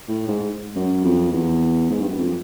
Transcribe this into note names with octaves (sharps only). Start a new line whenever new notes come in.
A2
G#2
F#2
F2
E2
G#2
G2
F#2
F2